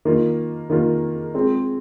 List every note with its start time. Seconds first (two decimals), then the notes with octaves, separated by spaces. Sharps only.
0.05 D#3 A#3 F4 A#4
0.70 D#3 A#3 F4 A#4
1.34 G#3 C4 F4